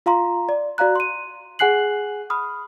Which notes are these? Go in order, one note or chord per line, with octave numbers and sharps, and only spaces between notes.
F4 F5 A#5 C6
D5
F#4 D5 F5 A#5 F#6
C6 D#7
G#4 F#5 G#5 F#6 C7 F#7
B5 D#6 F6